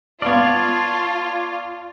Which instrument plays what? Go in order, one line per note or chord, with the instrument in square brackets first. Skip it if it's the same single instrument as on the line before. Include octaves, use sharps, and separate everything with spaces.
[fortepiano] B3 F5 F6 [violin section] F4 [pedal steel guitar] C#5 D5 [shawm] A5